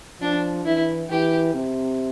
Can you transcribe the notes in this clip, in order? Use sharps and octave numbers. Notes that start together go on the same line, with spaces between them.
F3 D4
E3 E4
E3 G4
C3